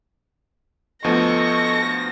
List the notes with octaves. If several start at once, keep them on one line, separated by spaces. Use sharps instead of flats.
D2 F3 B3 A4 D#5 C#6 A#6